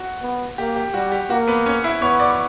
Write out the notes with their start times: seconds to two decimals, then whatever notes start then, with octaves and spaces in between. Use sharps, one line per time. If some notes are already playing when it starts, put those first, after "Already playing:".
Already playing: F#4
0.22 B3
0.58 A#3 G4
0.76 G4
0.94 G3 F#4
1.12 G4
1.30 A#3 F#4
1.48 B3 B4
1.66 C#4 C#5
1.84 E4 E5
2.02 B3 C#5 C#6
2.20 D5 D6
2.31 C#6